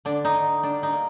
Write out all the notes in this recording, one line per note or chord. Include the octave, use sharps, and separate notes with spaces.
D3 D4
D#4
D3
G3 D4
D#4
A#3